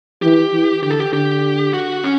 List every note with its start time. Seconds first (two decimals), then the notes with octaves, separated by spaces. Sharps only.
0.22 E3 G4
0.53 E3
0.83 D3 G4
0.91 A4
0.99 G4
1.13 D3 G4
1.73 F#4
2.04 C#4